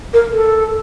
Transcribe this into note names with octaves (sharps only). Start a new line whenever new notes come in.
A#4
A4